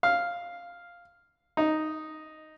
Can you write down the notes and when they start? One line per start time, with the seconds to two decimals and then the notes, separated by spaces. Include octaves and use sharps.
0.03 F5
1.57 D#4